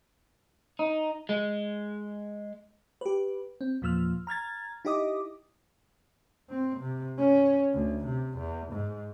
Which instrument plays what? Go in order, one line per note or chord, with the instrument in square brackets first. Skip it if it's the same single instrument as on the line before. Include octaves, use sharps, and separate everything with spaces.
[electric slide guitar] D#4
G#3
[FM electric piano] G4 B4
C4
E2 A#2 F3 E6 F6
A#5 F6 G#6 A6
D#4 E4 G4 D#5 D6 D#6
[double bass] C4
C3
C#4
D2
C3
E2
G#2